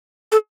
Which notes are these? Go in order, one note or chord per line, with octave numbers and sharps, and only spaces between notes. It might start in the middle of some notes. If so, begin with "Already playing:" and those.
A4